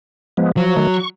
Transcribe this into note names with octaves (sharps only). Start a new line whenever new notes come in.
F3 G#3 B3
F3 F#3
D#3 A3
C#6